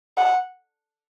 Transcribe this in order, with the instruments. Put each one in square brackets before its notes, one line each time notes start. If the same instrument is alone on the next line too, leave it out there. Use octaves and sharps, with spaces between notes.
[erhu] F#5